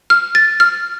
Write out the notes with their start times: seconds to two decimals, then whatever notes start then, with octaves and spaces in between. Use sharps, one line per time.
0.10 F6
0.35 A6
0.60 F6